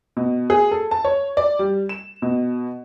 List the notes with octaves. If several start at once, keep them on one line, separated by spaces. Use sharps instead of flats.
B2
G#4
A4
A5
C#5
D5
G3
E7
B2